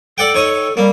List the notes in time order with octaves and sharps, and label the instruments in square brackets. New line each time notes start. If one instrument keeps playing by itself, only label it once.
[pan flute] A4 [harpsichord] D5 F#5 G5
[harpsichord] D#4 C#5 D#5
[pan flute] G3 [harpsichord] A#3